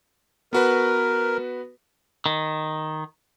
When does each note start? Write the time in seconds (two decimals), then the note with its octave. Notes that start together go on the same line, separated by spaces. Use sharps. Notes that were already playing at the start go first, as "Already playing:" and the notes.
0.53 B3 F#4 A#4 B4
2.26 D#3